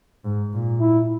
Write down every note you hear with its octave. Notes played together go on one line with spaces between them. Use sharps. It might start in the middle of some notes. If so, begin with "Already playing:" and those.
G#2
A#2
E4